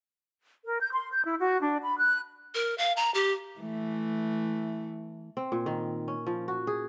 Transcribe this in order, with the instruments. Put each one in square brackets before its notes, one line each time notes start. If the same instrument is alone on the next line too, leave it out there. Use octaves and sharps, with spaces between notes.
[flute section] A#4
G6
C6
G6
E4
F#4
D4
B5
F#6
[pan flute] A#4
F5
A#5
G4
[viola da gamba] E3 A3
[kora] C4
A#2
D#3
C#4
F3
F#4
G#4